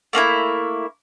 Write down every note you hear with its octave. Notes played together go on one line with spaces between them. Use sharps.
A3 A#3 D4 E4